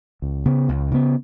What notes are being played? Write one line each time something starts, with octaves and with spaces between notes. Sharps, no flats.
C#2
C#3 B3
C#2
C#3 B3